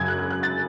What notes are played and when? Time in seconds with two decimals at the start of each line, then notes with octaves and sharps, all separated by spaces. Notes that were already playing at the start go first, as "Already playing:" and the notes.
Already playing: F#2 C#3 F#3 G#6
0.08 F#6
0.19 F#6
0.30 F#6
0.43 A6